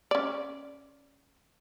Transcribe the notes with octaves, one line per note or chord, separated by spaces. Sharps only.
C#4 D5